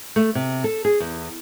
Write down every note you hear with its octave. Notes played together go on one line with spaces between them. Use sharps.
A3
C3
A4
G#4
E2